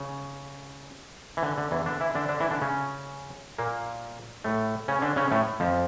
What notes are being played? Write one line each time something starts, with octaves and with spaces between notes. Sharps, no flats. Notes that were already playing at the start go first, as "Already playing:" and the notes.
Already playing: C#3
E3
D3
D3
E2 E3
D3 D4
E3 E4
D3 D4
D3 D4
E3 E4
D3 D4
C#3 C#4
A#2 A#3
A2 A3
C#3 C#4
D3 D4
C#3 C#4
A2 A3
F2 F3